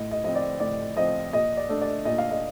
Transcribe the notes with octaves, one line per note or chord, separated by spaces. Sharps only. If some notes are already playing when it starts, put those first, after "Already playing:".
Already playing: A2 D#5
D#5
F3 C4 D#5
D5
A2 D5
F3 C4 D#5
A#2 D#5
D5
A3 D4
D5
A#2 D#5
F5
D#5